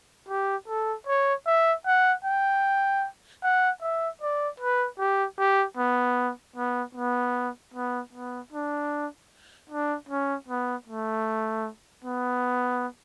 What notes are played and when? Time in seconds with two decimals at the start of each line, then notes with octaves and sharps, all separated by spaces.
0.28 G4
0.68 A4
1.07 C#5
1.46 E5
1.86 F#5
2.25 G5
3.43 F#5
3.81 E5
4.21 D5
4.60 B4
4.99 G4
5.38 G4
5.77 B3
6.56 B3
6.95 B3
7.74 B3
8.13 B3
8.52 D4
9.69 D4
10.09 C#4
10.48 B3
10.87 A3
12.04 B3